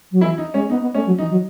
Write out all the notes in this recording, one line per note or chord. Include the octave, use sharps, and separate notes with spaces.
F#3
E3 E4
D#4
G#3 C#4
B3 D#4
B3
A3 C#4
F#3
E3 D#4
F#3